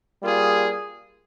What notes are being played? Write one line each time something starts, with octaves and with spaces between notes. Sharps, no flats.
G3 A#3 F4 G#4